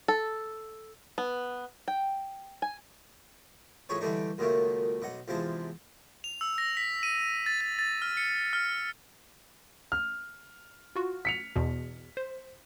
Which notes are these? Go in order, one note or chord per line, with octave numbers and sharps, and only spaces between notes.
A4
B3
G5
G#5
F2 A2 G#4 B4 C#5 D#6
D3 E3 G3 A3 D4 D#4
C#2 F#2 A#2 D#3 F#3 A3
B1 D#5 F#5
E2 C3 F3 G#3 A5
F7
E6
A#6
B6
D#7
A6
A6
A6
F6
C#7
F6
F6
F4 F#4
B6 C#7 F7
E2 B2
C5